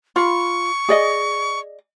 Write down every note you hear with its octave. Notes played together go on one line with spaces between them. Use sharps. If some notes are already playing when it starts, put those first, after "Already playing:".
F4 B5 C#6
G#4 D5 D#5